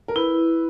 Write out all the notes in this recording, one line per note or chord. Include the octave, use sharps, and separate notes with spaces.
A#4
E4 B4